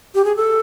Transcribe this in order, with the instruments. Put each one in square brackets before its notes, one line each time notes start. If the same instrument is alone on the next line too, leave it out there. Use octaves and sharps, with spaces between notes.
[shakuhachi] G4
G#4
A4